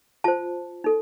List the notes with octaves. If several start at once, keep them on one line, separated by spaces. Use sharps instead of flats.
F4 C5 A5
D#4 A4